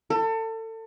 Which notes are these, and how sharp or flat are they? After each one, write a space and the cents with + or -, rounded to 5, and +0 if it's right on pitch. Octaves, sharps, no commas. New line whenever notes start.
A4 +30